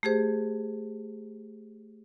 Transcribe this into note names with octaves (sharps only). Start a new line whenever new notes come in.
A3 G4 G#4 C5